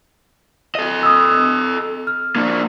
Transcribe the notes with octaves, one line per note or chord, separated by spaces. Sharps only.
A4 D#5
D#6 E6
F6
A#3 D4